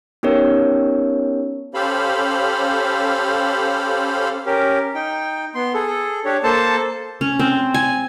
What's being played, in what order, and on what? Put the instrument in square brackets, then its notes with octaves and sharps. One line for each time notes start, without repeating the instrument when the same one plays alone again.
[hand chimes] B3 C#4 D#4 G4 A#4 C#5
[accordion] C#4 G4 A4 C5 F5 B5
[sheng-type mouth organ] C#4 G4 A#4
D#4 G5
B3 C6
G#4 A4
D4 G4 C#5
A#3 A4 C5 A5
[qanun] C#4
C4
G#5